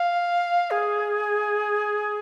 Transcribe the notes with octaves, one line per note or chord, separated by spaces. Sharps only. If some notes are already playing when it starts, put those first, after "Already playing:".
Already playing: F5
G#4